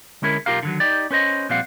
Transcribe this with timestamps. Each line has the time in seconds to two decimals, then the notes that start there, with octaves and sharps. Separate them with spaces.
0.22 D3 G#3 C#4 E4 A#4
0.46 B1 F4 G4 A#4 F5
0.63 D3 D#3 F#3
0.80 D#4 G4 D5
1.11 C#4 B4 C5 D#5
1.49 A#2 F3 G3 C4 F5 F#5